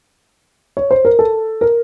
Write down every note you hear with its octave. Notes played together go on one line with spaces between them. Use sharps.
C#5
C5
A#4
A4
A#4